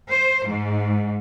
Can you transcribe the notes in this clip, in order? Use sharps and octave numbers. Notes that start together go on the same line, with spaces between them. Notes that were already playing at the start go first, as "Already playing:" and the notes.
C5
G#2